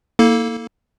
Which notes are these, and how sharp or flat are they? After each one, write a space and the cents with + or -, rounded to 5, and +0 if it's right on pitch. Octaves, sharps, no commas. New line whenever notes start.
A#3 +0 E4 -40 A4 +0